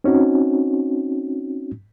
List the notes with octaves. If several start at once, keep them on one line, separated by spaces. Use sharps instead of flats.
C4 C#4 D#4 F#4